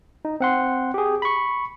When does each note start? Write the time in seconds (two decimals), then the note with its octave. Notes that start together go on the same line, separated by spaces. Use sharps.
0.25 D#4
0.40 C4 F#5 C6
0.94 G4 G#4
1.22 B5 C#6